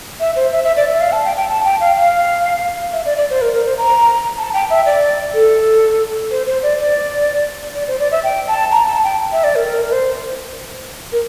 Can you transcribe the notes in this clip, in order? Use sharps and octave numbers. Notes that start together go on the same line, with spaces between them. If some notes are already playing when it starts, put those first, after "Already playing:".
E5
C5
E5
E5
D5
E5
F5
A5
G5
G5
A5
G5
F5
F5
E5
D5
D5
C5
A#4
A#4
C5
A#5
A5
G5
E5
D5
A4
C5
C5
D5
D5
D5
C5
D5
E5
G5
A5
A#5
A5
G5
E5
D5
A#4
A#4
A#4
C5
A#4